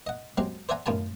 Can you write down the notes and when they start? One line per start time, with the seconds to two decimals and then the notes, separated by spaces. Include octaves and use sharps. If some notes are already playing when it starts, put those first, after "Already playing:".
0.07 D#5 F#5
0.38 F#3 G#3 C4 G4
0.69 C5 D5 E5 F#5 G#5 A#5
0.86 F#2 A2 D#3 F4 G#5 A5